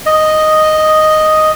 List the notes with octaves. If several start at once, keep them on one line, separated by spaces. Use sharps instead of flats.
D#5